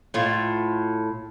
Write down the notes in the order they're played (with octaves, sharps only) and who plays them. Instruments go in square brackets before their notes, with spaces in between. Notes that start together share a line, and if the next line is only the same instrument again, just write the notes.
[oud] A2 F4